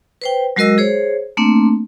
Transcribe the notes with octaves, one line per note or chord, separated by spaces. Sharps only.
B4 C5 G5
F#3 G#3 F#4 A#4 D#5 E6
G#4 C5 C#5
A3 A#3 C4 D4